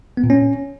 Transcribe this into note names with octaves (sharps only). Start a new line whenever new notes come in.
B3
A#2
C#4